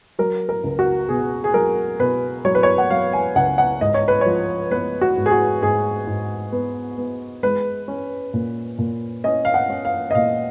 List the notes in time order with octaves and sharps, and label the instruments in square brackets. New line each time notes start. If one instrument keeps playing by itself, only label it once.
[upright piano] F#3 A#4
A#4
C#2
F#4
B2 G#4
G#4
F#3 A#4
B2 B4
F#3 C#5
B4
C#5
F#5
F#3 F5
G#5
C#2 F#5
F#5
G#2 D#5
C#5
B4
F3 C#5
B3 B4
F#4
G#2
G#4
F#4
G#2 G#4
G#2
B3
B3
G#3 B4
C#4
A#2
A#2
C#4 D#5
F5
F#5
C#4
F5
D#5
A#2 F5